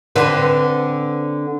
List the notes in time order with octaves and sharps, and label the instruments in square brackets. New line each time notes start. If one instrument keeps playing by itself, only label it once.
[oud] D3 C4 B4